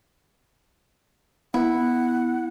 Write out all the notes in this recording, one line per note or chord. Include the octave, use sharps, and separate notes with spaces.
B3 E4 F#5